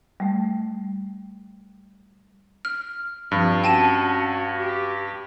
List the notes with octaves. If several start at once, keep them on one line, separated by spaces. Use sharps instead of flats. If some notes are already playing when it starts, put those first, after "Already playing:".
G3 A3
F6
G2 F3 C4
C#4 F#4 G5 A5 D#7
G4